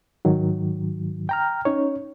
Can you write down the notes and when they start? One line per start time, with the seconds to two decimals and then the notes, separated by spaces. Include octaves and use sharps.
0.25 G#2 D#3 F#3
1.29 G5 A#5 F6
1.65 C#4 D#4 C#5